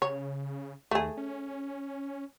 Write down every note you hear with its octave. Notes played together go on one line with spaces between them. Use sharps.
C#3 C#5
D#2 A3 G#4
C#4